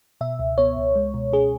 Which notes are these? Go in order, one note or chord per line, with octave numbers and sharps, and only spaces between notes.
B2 E5
C#2
B3 C#5
C#2
G#3
B2
C#4 G#4